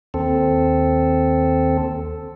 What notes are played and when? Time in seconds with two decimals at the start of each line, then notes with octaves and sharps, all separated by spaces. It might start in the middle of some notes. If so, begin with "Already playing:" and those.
0.14 D#2 C4 A4